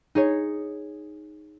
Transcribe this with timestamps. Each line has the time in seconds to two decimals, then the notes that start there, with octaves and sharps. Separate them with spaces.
0.15 D#4 G#4 C#5